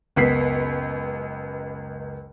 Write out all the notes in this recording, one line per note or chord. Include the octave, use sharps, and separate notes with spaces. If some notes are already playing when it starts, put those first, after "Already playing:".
F#1 C#2 B3 B6 C7